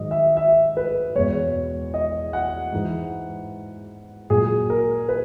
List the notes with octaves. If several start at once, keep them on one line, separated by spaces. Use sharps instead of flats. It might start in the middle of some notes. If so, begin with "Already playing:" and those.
Already playing: G#2 D#3 F#3 D#5
E5
E5
B4
E2 B2 G#3 C#5
D#5
F#5
G#2 E3 G#3
A#2 F#3 G#4
A#4
B4